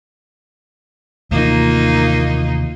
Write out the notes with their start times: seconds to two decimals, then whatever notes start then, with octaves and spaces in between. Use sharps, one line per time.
1.31 D#2 C3 E3 A#3 D#4 F4